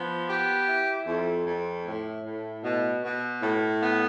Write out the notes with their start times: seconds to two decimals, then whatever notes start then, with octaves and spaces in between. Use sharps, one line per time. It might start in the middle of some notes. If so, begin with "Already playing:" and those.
Already playing: F3 B3
0.28 G4
0.67 E4
1.07 F2
1.46 F2
1.85 A2
2.25 A2
2.64 B2
3.03 B2
3.42 A2
3.82 B3